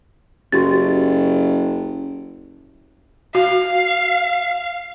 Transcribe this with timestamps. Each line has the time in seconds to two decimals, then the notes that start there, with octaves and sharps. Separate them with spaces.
0.52 F#1 F#4 G4 A6
3.35 F#4 F5